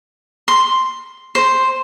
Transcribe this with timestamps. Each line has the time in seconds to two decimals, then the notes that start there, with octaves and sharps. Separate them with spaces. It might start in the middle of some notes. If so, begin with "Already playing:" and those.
0.48 C6
1.35 C5